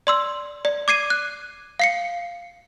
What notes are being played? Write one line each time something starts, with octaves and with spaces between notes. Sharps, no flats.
D5 C6 E6
D5
D6 G#6 C7 D#7
F#6
F5 C7 C#7